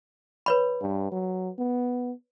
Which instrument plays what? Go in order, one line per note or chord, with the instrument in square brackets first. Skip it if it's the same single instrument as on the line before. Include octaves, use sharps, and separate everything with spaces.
[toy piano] B4 C#5 B5
[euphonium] G2
F#3
B3